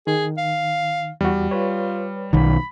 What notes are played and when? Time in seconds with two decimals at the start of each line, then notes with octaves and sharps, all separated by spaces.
0.07 D#3 G#4
0.38 F5
1.21 E2 G3 F#4
1.51 F4 B4 C#5
2.33 B1 D#3 B5